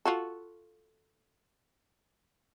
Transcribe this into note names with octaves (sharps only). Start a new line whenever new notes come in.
F4 F#4 A4